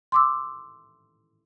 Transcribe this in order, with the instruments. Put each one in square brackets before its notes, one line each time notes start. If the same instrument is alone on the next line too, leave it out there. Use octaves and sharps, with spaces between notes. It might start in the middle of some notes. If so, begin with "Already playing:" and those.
[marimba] C6 D6 E6